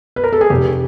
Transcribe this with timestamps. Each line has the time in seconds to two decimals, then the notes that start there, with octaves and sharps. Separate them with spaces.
0.16 B4
0.24 A#4
0.33 A4
0.41 G#4
0.50 F1 G4